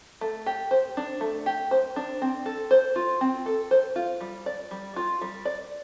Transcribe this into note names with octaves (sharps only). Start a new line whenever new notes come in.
A3
G4
C5
D4
A3
G4
C5
D4
C4
A4
C5
F4
C4
A4
C5
F4
G3
D5
G3
F4
G3
D5